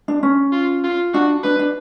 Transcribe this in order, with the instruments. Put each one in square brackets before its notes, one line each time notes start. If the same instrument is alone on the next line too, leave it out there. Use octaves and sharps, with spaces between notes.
[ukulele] D4
C#4
[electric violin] F4
F4
[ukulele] D4 [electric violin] F#4
[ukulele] D4 [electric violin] B4
[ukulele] D4